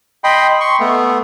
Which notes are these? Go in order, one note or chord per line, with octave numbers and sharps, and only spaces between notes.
D#5 G5 B5 C6
C6 C#6
A3 B3